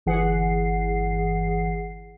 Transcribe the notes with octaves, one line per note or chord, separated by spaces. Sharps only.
G1 E3 G#4 F#5 C7